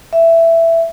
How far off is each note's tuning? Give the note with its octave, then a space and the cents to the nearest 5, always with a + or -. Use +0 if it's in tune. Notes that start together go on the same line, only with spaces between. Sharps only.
E5 +10